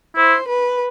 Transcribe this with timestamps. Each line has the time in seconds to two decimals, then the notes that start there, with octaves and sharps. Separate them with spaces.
0.16 E4 C5
0.47 B4